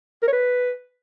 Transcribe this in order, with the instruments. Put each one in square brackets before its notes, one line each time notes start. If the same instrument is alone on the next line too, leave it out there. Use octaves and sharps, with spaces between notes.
[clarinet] A#4
C#5
B4